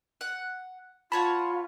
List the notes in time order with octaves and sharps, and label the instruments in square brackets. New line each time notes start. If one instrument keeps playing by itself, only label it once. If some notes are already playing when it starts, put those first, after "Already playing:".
[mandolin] F#5
[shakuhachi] F4 [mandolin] F#4 C#5 A5 [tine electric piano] B5